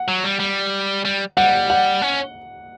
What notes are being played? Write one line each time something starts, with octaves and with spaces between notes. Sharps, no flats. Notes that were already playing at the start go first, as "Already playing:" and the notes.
Already playing: F#5
F#3
G3
G3
G3
G3 F#5
F#5
C#4